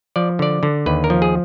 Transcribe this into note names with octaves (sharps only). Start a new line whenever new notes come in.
F3 D5
D3 D5
D3
D#2 B4
A#4
F3
G#4